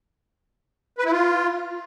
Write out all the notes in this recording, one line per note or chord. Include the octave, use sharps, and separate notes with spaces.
B4
E4
F4